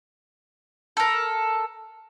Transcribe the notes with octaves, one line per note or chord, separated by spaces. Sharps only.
A4 A#4